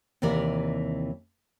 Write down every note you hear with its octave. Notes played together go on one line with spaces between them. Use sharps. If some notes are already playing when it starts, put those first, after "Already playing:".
D#2 C3 E3 A#4 D5